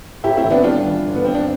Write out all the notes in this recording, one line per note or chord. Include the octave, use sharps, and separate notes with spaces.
A2 E4 G4
C4 E4
A1
B3 D4
G3 D4 F4
E3
G1
B3
G2 C4
D4